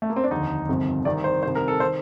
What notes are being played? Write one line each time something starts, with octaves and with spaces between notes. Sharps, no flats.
A3
A#3
C4
D4
F1 D#2 D3 D#4
G1 F2 C3 D#3
C2 C3 D#3 D5
C5
C2 C3 D#3 C5
A#4
A4
D#3 C5